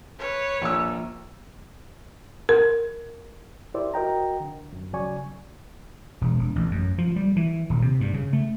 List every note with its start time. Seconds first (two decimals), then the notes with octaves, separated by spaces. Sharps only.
0.19 B4 C#5
0.62 A#1 A#3 E6
2.49 A#4
3.74 E4 G4 A#4 C5 D5 E5
3.94 F#4 A#4 D#5 G5 A#5
4.40 D3
4.73 F#2
4.93 D2 C#3 F#3 D5 G#5 C#6
6.21 E1
6.39 E1
6.56 A1
6.71 F#2
6.98 F3
7.16 G3
7.36 E3
7.70 D#1
7.82 C3
8.01 G2
8.14 C#3
8.33 A3